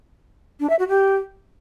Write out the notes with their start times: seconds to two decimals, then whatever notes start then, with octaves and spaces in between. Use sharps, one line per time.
0.60 D4
0.70 E5
0.79 F#4
0.89 G4